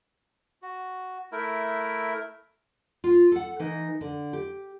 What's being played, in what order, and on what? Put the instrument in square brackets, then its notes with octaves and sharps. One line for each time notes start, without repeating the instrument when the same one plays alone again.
[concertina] F#4
A3 E4 A#4
[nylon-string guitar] F4
A4 F#5
E3 D#4
D3
G4